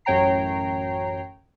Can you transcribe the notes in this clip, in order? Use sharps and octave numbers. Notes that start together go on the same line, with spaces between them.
A1 F#2 C#5 G5 A#5 C7